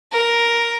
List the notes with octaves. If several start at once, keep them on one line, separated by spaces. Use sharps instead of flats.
A#4